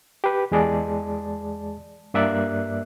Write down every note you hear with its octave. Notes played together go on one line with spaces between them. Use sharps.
G4 B4
E2 G#3 G#4 D5 A5
G2 A#3 D5 E5 F#6